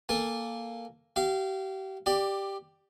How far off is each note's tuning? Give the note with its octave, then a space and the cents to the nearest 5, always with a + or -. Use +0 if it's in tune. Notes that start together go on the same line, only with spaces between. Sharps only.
A#3 +0 A4 +0 G#5 -30
G4 -35 F5 -25
G4 +0 D5 +15